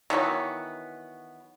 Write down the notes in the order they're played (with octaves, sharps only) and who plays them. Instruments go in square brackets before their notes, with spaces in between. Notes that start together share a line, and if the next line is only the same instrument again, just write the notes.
[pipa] D#3 E3 F#3 B3